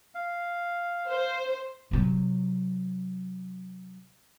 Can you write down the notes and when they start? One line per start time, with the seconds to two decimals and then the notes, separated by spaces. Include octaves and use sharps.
0.15 F5
1.09 C5
1.91 C3 F#3